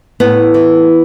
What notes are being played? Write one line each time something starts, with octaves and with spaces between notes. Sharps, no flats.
A2 B3
E3